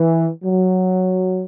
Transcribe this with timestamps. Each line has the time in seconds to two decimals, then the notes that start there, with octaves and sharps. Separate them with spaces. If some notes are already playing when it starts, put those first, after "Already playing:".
Already playing: E3
0.43 F#3